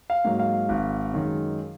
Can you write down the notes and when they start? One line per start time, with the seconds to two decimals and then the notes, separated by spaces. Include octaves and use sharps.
0.10 F5
0.25 G#2 F#3 A#3
0.39 F5
0.69 G#1
1.14 F#2 D#3 G#3